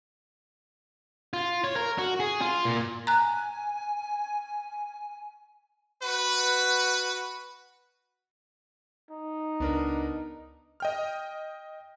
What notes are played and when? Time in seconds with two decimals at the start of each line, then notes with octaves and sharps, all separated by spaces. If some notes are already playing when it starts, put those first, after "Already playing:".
1.33 F4
1.64 C#5
1.76 A#4
1.98 F#4
2.20 G#4
2.41 F4
2.65 A#2
3.07 G#5 A#5 F#6
6.02 F#4 B4
9.11 D#4
9.60 C#2 B3 D4 A#4
10.80 D#5 G5 F6